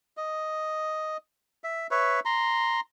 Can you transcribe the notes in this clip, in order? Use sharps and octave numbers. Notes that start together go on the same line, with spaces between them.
D#5
E5
B4 C#5 E5
A#5 C6